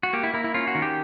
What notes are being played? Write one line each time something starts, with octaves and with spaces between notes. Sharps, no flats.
F#4
A#3 G4
E4
A#3 E4
E4
C#4 F4
F#4
D#3
G4